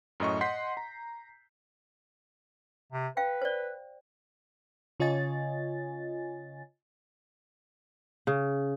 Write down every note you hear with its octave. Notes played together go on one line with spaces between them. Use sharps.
F#2 A2 D#5 C#6
D#5 F#5 C6 G6 B6 C7
A#5
C3
B4 F5 G5
C5 D5
C#3 F4 C#5 D#5 G#5 A6
C#3